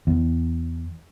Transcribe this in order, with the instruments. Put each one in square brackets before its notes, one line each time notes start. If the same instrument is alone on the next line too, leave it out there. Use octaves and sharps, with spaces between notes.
[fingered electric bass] E2